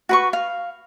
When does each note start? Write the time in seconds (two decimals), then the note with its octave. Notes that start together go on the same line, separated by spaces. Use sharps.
0.09 F#4 B4 C#6
0.33 F5